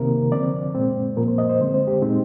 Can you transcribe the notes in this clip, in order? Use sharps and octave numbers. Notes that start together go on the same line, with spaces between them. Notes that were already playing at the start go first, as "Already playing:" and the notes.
Already playing: C3 D#3 A#3 A#4
D3 F3 C4 D5
A#2 G#3 C4
A#2 F3 A#3 A#4
C5
D#5
C5
D3 G#3 C4
C5
G4
A#2 G#3 C4 D#4